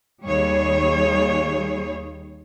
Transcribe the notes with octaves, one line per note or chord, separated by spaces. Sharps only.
D#2 G3 G#4 C#5